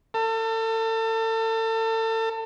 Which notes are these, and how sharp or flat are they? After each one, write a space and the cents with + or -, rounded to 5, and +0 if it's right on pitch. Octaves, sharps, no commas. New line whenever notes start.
A4 +35